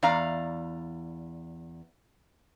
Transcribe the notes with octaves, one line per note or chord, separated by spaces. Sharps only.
E2 D5 F5 A#5